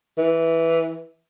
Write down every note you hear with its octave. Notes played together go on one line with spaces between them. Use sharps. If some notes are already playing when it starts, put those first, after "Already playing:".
E3